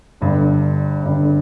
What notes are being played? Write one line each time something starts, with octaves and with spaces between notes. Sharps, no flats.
G1 G2 D3
G1 G2 D3